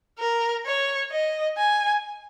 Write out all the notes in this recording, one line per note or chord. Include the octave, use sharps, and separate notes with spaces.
A#4
C#5
D#5
G#5